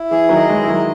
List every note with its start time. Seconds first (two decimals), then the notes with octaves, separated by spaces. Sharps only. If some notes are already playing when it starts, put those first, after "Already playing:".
Already playing: E4
0.11 E3 G#4
0.29 D#3 F#3
0.36 D#5
0.48 E3 G#3
0.62 E4
0.68 D#3 F#3